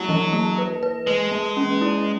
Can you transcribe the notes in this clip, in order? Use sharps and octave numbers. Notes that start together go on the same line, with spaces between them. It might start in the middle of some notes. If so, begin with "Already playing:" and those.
Already playing: F#3 A#3 E4
E3
A#3
B4
B4
G#3 B4
A#3
C#4
E4